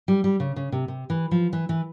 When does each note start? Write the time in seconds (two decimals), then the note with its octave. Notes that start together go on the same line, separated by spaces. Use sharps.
0.08 G3
0.24 G3
0.40 C#3
0.56 C#3
0.72 C3
0.88 C3
1.10 E3
1.31 F3
1.53 E3
1.69 E3